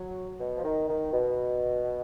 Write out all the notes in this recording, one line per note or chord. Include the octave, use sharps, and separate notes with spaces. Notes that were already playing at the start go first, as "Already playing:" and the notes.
Already playing: F#3
B2
F3
D#3
D#3
B2